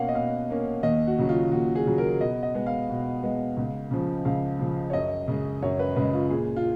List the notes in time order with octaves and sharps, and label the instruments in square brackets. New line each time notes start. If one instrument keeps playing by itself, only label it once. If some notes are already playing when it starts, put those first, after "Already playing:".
Already playing: [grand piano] B2 A#3 C#4 F5 F#5
D#5
B2 F5
A#3 C#4
D#2 D#5
F#4
C#3 F#3
F4
D#2 F#4
G#4
C#3 F#3
A#4
B2 D#5
D#5
G#3 B3
F5
B2
G#3 B3
C#2
C#3 F3
C#2 F5
C#3 F3
C#5
F#2 D#5
C#3 G#3
F#2 C#5
B4
C#3 G#3 B4
F4
A#2 G#4
F4